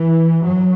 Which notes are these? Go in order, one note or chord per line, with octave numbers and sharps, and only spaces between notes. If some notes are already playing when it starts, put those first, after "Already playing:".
Already playing: E3
F#2 F#3